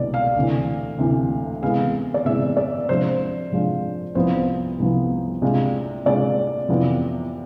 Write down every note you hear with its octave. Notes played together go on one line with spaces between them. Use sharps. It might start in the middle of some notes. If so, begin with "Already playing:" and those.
Already playing: C2 B2 G#3 D4 D5
F5
D2 C3 E3
D2 C3 E3
C3 E3 G#3 B3 F5
D5
C3 E3 G#3 B3 E5
D5
C3 F3 G#3 D4 F4 C5
C3 F3 G#3 D4 F4
C2 C3 F3 B3 C5
C2 C3 F3 B3
C3 G#3 D4 F4
C3 G#3 D4 F4 D5
F2 C3 E3 B3 F4